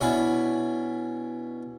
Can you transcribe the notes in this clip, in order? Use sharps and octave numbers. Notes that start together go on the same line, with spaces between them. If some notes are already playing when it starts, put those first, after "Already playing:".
B2 C#4 D4 E4 B5